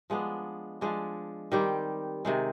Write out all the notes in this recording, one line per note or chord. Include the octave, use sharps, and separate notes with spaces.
F3 G#3 B3 D4
F3 G#3 D4
D#3 G3 C4 G4
C3 D#3 G#3